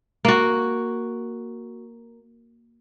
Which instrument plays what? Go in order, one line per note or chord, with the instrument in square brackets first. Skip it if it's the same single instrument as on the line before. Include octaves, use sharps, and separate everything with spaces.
[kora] A#3 F#4